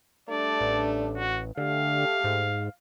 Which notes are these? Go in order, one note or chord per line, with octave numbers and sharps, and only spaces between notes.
G3 A3 D4 D5
A1
F#4
D3 A3 G4 F5
G#2